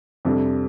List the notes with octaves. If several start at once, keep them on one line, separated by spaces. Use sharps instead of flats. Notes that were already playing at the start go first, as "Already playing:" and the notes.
F2 C3 G3 D4 A4